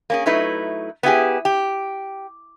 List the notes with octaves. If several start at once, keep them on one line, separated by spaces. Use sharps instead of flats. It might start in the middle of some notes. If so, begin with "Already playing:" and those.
A#3 C#4 G#4
F#3 A3 D#4 E4 B4
B3 E4 G4 G#4
G4